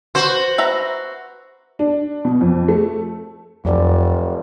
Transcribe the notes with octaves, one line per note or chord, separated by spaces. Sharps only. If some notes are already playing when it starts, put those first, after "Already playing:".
F#4 B4 C5
B4 E5 A#5
D4
B2
F2
A3
F1 F2 F#3 F4 D5